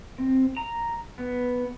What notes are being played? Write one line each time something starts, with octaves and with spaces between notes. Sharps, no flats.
C4
A#5
B3